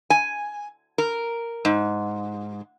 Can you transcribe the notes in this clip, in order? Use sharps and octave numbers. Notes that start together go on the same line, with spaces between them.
G#5
A#4
G#2